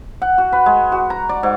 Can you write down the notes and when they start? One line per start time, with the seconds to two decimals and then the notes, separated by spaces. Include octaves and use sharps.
0.22 F#5
0.38 F#4
0.53 B4
0.66 G#3
0.92 F#4
1.10 A#5
1.29 D5
1.43 G#2